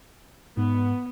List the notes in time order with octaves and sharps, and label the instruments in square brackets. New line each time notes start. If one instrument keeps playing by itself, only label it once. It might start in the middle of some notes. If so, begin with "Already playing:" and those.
[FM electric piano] G#2 [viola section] B3